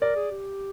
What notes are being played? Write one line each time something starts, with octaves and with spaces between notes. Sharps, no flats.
A#4 D5
G#4
G4